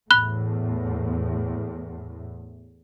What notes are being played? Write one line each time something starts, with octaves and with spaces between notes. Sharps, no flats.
E2 A2 B5 F#6 G7